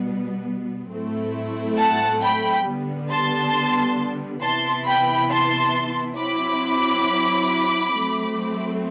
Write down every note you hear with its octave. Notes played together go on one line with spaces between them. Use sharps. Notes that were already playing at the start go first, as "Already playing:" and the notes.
Already playing: B2 G3 B3
A2 F#3 A3 C4 E4
F#5 A5
G5 B5
D3 G3 B3
A5 C6
C3 E3 B3 E4 A5 C6
G5 B5
A5 C6
F#3 C4 E4 B5 D6
F#3 A3 C4